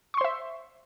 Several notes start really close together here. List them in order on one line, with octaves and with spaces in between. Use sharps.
C#6 C6 C5 E5